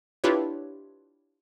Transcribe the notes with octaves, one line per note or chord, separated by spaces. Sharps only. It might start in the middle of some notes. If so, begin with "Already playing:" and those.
D4 E4 F4 G4 B4 C#5